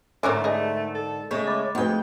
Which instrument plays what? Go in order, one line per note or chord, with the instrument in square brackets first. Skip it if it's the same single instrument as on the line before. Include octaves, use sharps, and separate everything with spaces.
[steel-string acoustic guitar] G#2 D3 [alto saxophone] A3 [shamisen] A#4 C#5 D5
[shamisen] G#4 D#5 [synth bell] A#4 D5
[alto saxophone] A4
[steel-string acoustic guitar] C#3 A3 C#5 [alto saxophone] G#3 [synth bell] G6
[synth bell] B5 D6 A6
[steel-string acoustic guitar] F2 G5 [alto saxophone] G#3 [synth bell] A3 F#4 B4